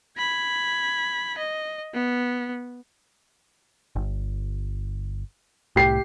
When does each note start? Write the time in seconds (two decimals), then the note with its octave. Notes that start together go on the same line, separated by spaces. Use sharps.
0.18 B5 G#6
1.38 D#5
1.94 B3
3.96 G1
5.76 C2 A2 G4 C7